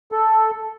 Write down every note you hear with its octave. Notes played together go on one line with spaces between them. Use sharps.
A4